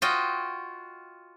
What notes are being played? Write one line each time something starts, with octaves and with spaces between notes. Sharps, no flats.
F4 F#4 D#5 G5